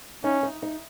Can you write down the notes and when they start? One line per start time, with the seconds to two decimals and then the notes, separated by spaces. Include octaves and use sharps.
0.24 C#4 D#4
0.43 D#4
0.62 D#4